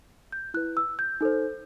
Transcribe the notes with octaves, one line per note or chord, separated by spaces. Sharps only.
G6
E4 B4 F#6
E6
G6
D#4 A4 C5